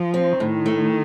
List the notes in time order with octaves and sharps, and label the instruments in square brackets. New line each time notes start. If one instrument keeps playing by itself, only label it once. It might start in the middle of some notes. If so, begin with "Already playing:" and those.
Already playing: [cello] F3
[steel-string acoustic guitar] C4
[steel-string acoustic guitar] A2 [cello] D#3
[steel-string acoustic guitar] A3